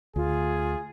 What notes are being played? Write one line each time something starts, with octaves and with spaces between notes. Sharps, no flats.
D2 F4 G#4